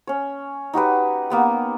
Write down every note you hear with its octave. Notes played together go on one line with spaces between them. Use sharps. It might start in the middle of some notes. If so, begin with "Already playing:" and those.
C#4 C#5
D#4 F#4 G4 B4
A#3 B3 G4